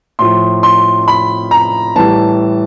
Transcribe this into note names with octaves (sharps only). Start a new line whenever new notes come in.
A2 F3 C6
C6
B5
A#5
A2 E3 G3 A5